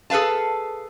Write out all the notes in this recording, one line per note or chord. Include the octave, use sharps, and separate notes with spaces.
G#4 A4 B4 F5 A5